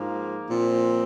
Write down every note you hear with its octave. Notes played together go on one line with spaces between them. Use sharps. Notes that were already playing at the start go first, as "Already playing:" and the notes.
Already playing: G#2 F3 A#3
A#2 F3 C4